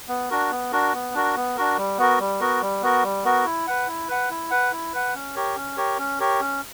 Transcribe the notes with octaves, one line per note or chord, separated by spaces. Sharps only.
B3
D4 F#4 A#4
B3
D4 F#4 A#4
B3
D4 F#4 A#4
B3
D4 F#4 A#4
G3
B3 F#4 A#4
G3
B3 F#4 A#4
G3
B3 F#4 A#4
G3
B3 F#4 A#4
E4
B4 F#5
E4
B4 F#5
E4
B4 F#5
E4
B4 F#5
C#4
G4 A#4 C#5
C#4
G4 A#4 C#5
C#4
G4 A#4 C#5
C#4